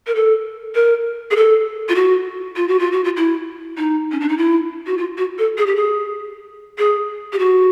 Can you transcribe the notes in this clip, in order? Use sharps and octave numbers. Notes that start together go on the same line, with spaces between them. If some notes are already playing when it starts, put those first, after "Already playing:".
A#4
A4
A#4
G#4
A4
F4
F#4
F4
F#4
F4
F#4
F4
E4
D#4
C#4
D4
D#4
E4
F#4
F4
F#4
A4
G#4
G4
G#4
G#4
G4
F#4